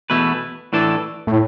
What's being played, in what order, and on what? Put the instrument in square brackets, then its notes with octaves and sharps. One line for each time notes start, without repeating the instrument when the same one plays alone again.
[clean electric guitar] E2 B2 A3 E4 B4
A2 E3 D4 A4
[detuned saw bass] A2